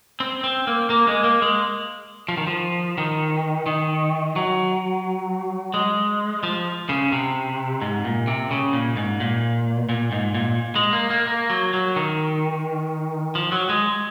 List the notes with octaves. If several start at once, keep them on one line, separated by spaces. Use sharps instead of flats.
C4
C4
A#3
A#3
G#3
A#3
G#3
F3
D#3
F3
D#3
D#3
F#3
G#3
F3
C#3
C3
G#2
A#2
C3
C#3
A#2
G#2
A#2
A#2
G#2
A#2
G#3
A#3
A#3
A#3
F#3
F#3
D#3
F3
F#3
G#3